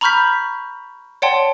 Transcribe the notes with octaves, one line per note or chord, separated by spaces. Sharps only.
A#5 B5 C#6 F6 G6 B6
C#5 D5 F#5 G5 A5 C6